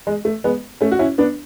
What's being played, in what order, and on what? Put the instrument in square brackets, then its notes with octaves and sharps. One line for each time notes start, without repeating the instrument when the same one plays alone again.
[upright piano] G#3
A3
G#3 B3
A3 C#4
F#4
C#4 E4
B3 D4